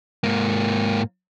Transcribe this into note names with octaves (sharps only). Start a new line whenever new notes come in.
G#2 A#3